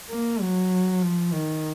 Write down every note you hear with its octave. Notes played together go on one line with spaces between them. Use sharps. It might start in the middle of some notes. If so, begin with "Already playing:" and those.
A#3
F#3
F3
D#3